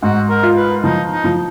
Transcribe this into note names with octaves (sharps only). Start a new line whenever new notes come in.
G#2 F#4
A#4
F4
B4
F3 D#4
D#4
F3